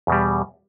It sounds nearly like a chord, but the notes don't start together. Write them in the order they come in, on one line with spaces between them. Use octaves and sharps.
E2 B2 G3